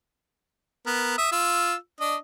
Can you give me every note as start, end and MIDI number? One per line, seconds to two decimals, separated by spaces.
0.86 1.14 59
0.86 1.14 70
1.18 1.28 76
1.18 1.28 87
1.32 1.75 65
1.32 1.75 88
2.00 2.16 62
2.00 2.16 75